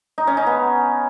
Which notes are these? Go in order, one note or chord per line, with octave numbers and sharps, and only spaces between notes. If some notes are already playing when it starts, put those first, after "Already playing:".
D#4
C#4
D#4
B3